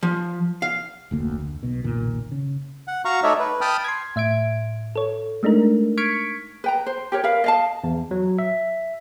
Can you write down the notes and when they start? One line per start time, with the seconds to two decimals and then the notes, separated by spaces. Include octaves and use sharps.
0.03 F3
0.62 F5
1.11 F1 D2 A#3
1.38 D2
1.63 B1 B2
1.84 F#1 B1 A#2 D#3
2.32 C#3
2.88 F#5
3.05 F#4 F5 A#5 C#6
3.23 A3 D#4 C#5 D5 E5
3.40 B4
3.61 G5 A5 B5 D#6 F6
3.84 C6 G#6
4.16 A2 E5 G#6 D7
4.96 A4 C#5
5.43 G#3 A3 D4 D#4 A#4
5.98 C#6 F6 G#6 B6 C#7 D7
6.64 B4 G5 A#5
6.86 C5
7.12 G4 A#4 C#5
7.24 A#4 B4 F5
7.44 D#5 F5 A5
7.84 E2
8.11 F#3
8.39 E5